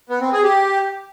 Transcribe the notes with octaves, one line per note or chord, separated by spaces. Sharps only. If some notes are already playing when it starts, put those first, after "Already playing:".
B3
C4
G#4
G4